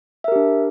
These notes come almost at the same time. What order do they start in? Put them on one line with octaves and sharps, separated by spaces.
E5 A#4 G4 D4